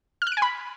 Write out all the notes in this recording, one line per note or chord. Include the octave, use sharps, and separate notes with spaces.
F6
F#6
D7
G#5
B5